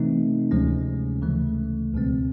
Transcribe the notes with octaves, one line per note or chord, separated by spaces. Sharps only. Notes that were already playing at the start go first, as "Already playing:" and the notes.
Already playing: C3 E3 A3 C4 D#4
D2 C3 F3 G#3 C#4
D2 C#3 E3 A3
C#2 B2 G#3 C4